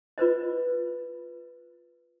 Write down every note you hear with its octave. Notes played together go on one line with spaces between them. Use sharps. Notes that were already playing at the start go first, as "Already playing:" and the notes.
F4 B4 C5 D#5